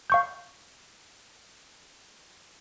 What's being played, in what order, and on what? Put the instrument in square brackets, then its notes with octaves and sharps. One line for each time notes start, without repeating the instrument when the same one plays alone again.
[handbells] F5 C#6 G6